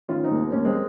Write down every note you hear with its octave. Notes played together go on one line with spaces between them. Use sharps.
D#3 C#4 F4
C4 D#4
D#2
C4
D#2 C#4
G#3 C4